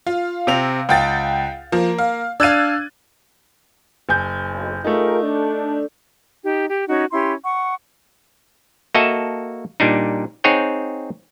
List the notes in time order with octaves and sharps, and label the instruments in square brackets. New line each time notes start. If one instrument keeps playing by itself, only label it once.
[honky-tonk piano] F4 [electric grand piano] F5
[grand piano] C3 C4 F7
[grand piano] C#2 [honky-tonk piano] F#5 G5 A6
[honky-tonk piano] F3 [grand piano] A#3
[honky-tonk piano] F5
[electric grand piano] D4 G#6 A6 [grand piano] D5 F5 [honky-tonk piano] E6 F#6 D#7
[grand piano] F#1 G#5 G6
[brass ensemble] B1
[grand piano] A3 D#4 [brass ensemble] F4 G#4 A#4
[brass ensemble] D4 A4
[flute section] D#4 G4
G4
C#4 D#4 F#4
C#4 E4 G4 C6
F#5 C#6
[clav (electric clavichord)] A#3 F#4 A4 D#5 E5 A5
A#2 G3 D4 D#4
C4 D#4 G#4 C#5 F#5 G5